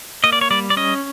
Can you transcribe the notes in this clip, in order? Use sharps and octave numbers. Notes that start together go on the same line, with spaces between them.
A#3 D#5
D5
C#5
G3 D5
D5
C#4 D#5